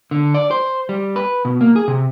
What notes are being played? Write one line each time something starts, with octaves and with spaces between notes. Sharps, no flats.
D3
D5
C5
G3
B4
B2
A#3
G#4
C3